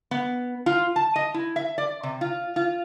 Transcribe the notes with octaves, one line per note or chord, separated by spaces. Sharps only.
B3
F4
A5
D#5
E4
E5
D5
C3
F4
F4